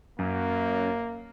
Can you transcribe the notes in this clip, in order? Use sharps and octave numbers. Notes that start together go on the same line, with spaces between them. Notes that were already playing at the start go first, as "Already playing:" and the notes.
F#2 A#3